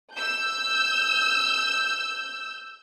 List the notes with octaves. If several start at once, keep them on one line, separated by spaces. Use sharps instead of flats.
E6 G6